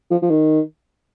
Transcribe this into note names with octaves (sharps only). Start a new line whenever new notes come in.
F3
F3
D#3